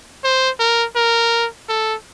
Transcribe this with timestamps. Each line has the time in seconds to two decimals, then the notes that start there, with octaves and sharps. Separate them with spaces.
0.24 C5
0.60 A#4
0.96 A#4
1.69 A4